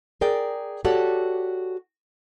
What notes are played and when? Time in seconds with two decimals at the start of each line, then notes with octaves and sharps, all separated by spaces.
0.21 G#4 A#4 D5 G5
0.85 F#4 G4 A4 C#5 D5 F#5